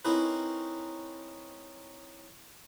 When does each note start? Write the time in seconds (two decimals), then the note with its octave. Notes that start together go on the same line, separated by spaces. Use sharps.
0.05 C4 C#4 D#4 E4 A#4 B4